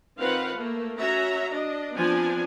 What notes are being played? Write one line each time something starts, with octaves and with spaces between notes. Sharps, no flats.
D#3 C4 F4 B4 F5 F#5
A3 A#3
C#4 F#4 E5 A#5
D4 D#5
F3 B3 C4 D4 G#5